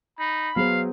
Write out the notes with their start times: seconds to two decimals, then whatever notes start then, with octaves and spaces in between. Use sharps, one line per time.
0.19 D#4 B5
0.56 F#3 B3 G#4 C5 F5